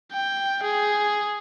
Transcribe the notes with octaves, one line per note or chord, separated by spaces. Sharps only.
G5
G#4